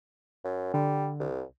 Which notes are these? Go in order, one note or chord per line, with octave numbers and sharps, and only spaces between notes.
F#2
D3 G3
C2